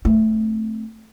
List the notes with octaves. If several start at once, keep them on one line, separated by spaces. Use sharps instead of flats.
A3 C4